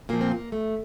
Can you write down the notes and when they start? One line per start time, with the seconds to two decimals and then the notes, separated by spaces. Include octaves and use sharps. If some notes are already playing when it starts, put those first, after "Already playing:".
0.09 A#2 F3 A#3
0.21 C4
0.32 A#3
0.52 A3